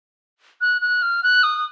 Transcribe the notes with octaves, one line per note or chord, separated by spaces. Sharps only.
F#6
F#6
F6
F#6
D#6